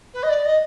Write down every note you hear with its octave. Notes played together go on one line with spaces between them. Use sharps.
B4
D#5
D5
D#5